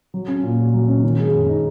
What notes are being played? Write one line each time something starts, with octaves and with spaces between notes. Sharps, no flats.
F#3
C#4
A#2
F#4
F#3
C#4
D#3
G#3
F#2
D#4